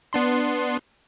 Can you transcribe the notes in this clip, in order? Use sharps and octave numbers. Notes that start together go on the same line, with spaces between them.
B3 D4 C6